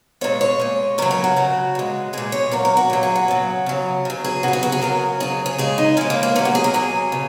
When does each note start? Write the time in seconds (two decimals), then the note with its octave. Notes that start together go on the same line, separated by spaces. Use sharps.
0.21 A#2 G#3 C#5
0.41 C#5
0.60 A#2 G#3
0.98 C#3 A#4
1.02 F#3
1.11 A#4
1.24 F#4
1.36 C#3 F#3
1.75 A#2 G#3
2.13 A#2 G#3 G#4
2.32 C#5
2.51 A#2 F#3 A#4
2.65 A#4
2.77 F#4
2.90 A#2 F#3
3.03 G#4
3.16 F#4
3.28 C#3 F#3
3.66 C#3 F#3
4.05 C#3 F#3
4.24 G#4
4.43 C#3 F#3 F#4
4.53 G#4
4.63 F#4
4.72 G#4
4.82 C#3 F#3 A#4
5.20 C#3 F#3 G#4
5.46 G#4
5.58 C#3 G#3 G#4
5.78 D#4
5.97 C#3 G#3 C#4
6.10 A#3
6.23 A#3
6.35 A#2 F#3 C#4
6.45 F#4
6.55 G#4
6.64 A#4
6.74 A#2 F#3 G#4
7.12 C#3